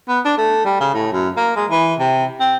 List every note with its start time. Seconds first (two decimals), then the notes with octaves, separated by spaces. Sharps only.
0.09 B3
0.25 D4
0.38 A3
0.65 G3
0.81 C#3
0.94 A2
1.13 F#2
1.37 A#3
1.56 G#3
1.70 E3
2.00 C3
2.40 C4